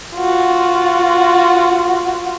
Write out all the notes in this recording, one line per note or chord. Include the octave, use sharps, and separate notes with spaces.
F4 F#4